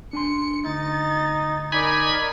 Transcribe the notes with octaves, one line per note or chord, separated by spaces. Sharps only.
D4 G#5 C6 C#7
D2 D#4 A6
D#4 A#4 D5 G#5 B5